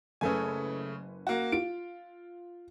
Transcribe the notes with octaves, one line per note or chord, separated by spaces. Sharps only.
F#1 C#3 A3 B4 G#5
A#3 F#4
F4 D7